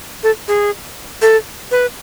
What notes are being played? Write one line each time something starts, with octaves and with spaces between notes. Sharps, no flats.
A4
G#4
A4
B4